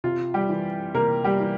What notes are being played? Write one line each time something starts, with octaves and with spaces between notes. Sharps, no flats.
C3 F4
G3 G4
E3
C3 A#3 A#4
G3 G4
E3